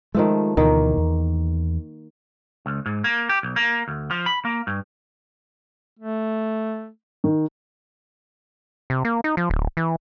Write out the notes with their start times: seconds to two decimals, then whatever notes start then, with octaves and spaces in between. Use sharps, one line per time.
0.15 D#3 F3 G#3 A3
0.57 D2 B2 D#3 E3 A#3
0.97 E2
2.66 C#2
2.86 G#2
3.04 A#3
3.29 G4
3.43 B1
3.56 A#3
3.88 D2
4.11 F3
4.26 B5
4.45 A#3
4.67 G2
5.99 A3
7.24 D#3
8.90 C3
9.05 A#3
9.24 D#4
9.37 F3
9.50 D1
9.77 E3